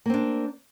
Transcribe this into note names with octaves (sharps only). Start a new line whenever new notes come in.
A#3 C4 D4